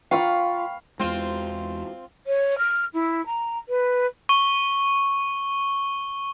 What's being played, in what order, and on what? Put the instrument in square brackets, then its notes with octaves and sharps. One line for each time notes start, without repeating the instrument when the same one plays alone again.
[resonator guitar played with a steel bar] F4 [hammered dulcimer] F5 B5 C#6 [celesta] G5
[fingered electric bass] E2 G#3 [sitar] C4 F4
[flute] C#5
F6
E4
A#5
B4
[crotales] C#6 G7